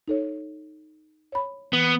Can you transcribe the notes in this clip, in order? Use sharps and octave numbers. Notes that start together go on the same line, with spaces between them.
D#4 A4 C#5
C#5 B5
E3 B3